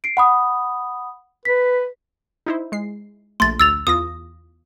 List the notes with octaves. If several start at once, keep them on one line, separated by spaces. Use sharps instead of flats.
C7 D7
F#5 B5 D#6
B4 B6
D#4 E4 C5
G#3 C7
A#1 A3 C6 A6
D2 E6 A6 F7
E2 F4 D#6 A#6